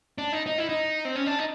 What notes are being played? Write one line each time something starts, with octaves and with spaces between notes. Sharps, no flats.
D4
D#4
D#4
E4
D#4
C4
C#4
D4
D#4